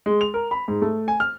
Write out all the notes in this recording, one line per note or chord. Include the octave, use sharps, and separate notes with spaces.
G#3
F7
A#4
B5
G#2
A3
G#5
F6